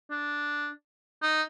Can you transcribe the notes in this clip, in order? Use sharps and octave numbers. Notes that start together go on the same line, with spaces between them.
D4
D#4